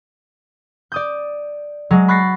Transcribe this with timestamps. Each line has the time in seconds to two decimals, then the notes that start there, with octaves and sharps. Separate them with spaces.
0.92 D5 D#6 G6
1.91 F#3 G#3
2.08 B5 C#6 F#6 A6 A#6 C7